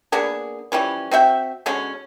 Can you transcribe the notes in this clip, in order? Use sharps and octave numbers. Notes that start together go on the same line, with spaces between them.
A#3 B3 D4 G#4
E3 F3 G3 C#4
C4 F#4 E5 G5
B2 D3 G#3 C#4